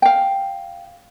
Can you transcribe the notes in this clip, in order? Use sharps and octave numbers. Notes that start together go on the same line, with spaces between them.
F5 G5